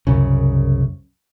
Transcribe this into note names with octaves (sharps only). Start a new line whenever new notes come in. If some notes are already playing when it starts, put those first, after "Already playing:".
C2 F#2 C#3